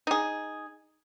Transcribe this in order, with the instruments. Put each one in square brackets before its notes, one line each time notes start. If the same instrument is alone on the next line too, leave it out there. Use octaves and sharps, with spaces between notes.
[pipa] D#4 G#4